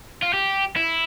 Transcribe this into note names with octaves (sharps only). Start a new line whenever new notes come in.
F4
G4
E4